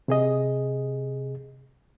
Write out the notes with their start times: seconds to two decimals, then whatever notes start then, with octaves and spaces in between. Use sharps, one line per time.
0.08 C3 G#4 D#5